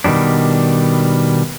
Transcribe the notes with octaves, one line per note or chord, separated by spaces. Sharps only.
B2 D#3 F3 G3 D4